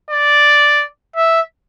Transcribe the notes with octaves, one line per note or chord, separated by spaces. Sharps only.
D5
E5